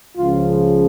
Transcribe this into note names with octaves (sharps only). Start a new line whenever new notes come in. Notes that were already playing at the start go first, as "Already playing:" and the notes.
C#2 C#3 F3 F4